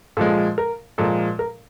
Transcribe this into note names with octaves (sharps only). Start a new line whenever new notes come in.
A#2 F3 G#3 A4
A#4
A#2 F3 G#3 A4
A#4